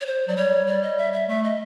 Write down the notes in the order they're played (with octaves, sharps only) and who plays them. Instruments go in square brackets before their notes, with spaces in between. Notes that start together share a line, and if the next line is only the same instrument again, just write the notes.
[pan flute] C#5
C5
[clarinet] F#3 [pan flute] D5
[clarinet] G3 [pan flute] C#5
[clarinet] G3 [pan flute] D5
[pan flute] D#5
E5
E5
[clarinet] A3 [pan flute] E5
[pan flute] D#5